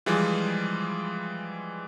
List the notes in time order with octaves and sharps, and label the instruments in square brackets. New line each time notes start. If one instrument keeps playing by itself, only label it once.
[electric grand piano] E3 F3 G3 G#3 F4 G#4